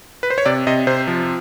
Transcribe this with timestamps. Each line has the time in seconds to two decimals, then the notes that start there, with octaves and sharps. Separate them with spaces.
0.23 B4
0.30 C5
0.38 C#5
0.46 C3 D5
0.67 C3 D#5
0.87 C3 C5
1.07 F3